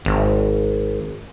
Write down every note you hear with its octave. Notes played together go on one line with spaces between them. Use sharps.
G#1